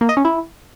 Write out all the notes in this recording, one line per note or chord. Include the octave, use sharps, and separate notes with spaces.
A#3
D#5
C#4
E4